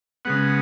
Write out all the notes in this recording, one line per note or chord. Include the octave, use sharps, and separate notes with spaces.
C#3 G#3 B3 F#5